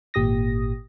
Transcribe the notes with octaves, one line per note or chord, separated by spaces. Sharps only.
G#1 A#2 G4 D#6 A#6